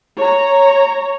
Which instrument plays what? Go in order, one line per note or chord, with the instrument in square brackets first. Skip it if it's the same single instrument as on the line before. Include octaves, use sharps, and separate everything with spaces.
[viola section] C#5 A#5